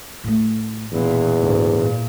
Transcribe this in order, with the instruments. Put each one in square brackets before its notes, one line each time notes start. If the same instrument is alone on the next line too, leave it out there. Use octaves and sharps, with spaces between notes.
[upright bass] A2 A3
[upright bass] E1 [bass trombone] E2 [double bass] A#2 E3
[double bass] D2 [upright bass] G#2
[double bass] A#2